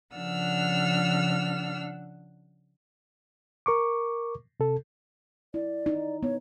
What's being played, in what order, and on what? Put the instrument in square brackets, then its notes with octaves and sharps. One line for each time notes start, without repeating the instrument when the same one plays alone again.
[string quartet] C#3 F3 D4 F#5 E6 F6
[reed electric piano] A#4 C#6 D6
C3 A4
[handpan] E4 [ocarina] D5
[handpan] D#4
[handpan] B3 [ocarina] C#5